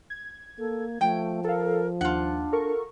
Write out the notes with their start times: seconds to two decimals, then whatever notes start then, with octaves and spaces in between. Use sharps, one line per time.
0.10 G#6
0.59 A#3 A4
1.01 F3 A3 G5
1.44 A4 A#4 F5
2.01 D#2 D4 F4 F#5
2.52 A4 A#4 C#6